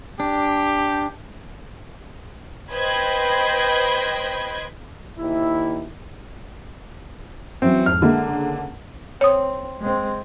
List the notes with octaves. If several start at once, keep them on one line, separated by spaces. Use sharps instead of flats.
D4 G4
B4 C5 D#5 G5 B5 G#6
D#2 E4
E3 F#3 C4 C#4
F2 G#2 D#4 F6
D3 G#3 A#3 E5
C#3
C4 C#5 D#6
G#3 C4